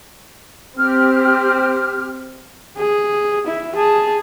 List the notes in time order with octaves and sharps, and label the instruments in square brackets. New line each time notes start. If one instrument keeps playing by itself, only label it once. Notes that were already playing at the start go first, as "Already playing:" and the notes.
[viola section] C4 [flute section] G4 F6
[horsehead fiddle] G#4
E4
G#4 A5